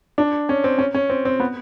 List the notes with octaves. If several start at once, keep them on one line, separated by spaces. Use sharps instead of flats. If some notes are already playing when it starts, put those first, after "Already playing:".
D4
C#4
C4
C#4
C#4
C4
C4
B3